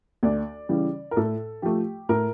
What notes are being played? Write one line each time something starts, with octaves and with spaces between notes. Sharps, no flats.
D2 D5
C#3 E3 G3
A#4
A2 A4
F3 A3 G4
A2 A#4